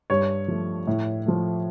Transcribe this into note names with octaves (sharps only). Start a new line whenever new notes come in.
G2 C#5
F3 A3
A2
F3 A3